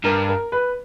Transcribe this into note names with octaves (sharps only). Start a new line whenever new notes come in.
G2 A#4
A#4
B4